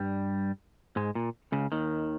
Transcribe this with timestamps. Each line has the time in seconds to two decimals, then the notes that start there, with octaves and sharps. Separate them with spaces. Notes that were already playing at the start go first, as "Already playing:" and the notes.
Already playing: G2 G3
0.96 G#2 G#3
1.15 A#2
1.52 C#2 C#3
1.72 D#2 D#3